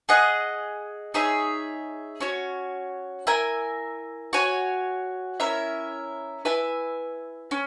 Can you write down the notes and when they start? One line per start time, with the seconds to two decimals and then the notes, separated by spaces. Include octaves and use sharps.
0.09 G#4 D#5 F#5
1.14 D#4 G#4 C#5 E5
2.20 C#4 F#4 C#5
3.27 E4 A#4 E5 G#5
4.33 F#4 C#5 G#5
5.40 C#4 E4 A#4 E5
6.45 E4 B4 E5 G#5
7.51 C#4